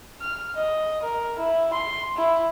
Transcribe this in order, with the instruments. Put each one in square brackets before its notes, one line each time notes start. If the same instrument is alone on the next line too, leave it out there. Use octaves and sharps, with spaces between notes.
[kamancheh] F6
D#5
A#4
E4
C6
E4